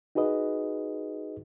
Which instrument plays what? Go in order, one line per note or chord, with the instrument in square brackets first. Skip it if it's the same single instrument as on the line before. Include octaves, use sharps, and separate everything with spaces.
[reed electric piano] D#4 F#4 G#4 B4 D#5